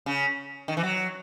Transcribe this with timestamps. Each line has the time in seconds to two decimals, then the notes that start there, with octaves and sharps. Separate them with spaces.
0.06 C#3
0.68 D#3
0.77 E3
0.83 F#3